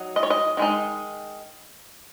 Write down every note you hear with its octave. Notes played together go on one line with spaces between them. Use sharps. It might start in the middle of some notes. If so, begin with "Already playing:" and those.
Already playing: F#3 D#4
D#5
C#5
D#5
D#3 G#3 D#4